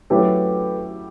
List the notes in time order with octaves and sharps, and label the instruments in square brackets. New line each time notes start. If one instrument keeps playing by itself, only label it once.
[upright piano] F#3 A3 C#4 E4 G4 [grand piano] A4 B4